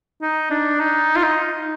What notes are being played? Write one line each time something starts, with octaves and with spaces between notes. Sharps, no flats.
D#4
D4
D#4
F4
D#4